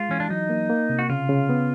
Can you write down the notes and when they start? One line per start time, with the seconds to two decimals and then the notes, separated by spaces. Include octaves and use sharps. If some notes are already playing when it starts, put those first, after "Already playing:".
Already playing: G#3 F4
0.09 E3 C#4
0.20 D4
0.29 F#3 D#4
0.50 A#3
0.70 A#3
0.90 C3
0.99 F#4
1.10 C#3 F4
1.29 C#3
1.49 B3